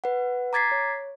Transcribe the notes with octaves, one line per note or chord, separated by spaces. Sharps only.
B4 F#5
A#5 D6 G#6 A6 B6 C7
C#5